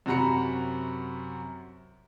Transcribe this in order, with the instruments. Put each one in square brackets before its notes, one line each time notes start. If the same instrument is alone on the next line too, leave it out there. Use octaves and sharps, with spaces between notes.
[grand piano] F#2 C3 F#4 A#5 B5 C#7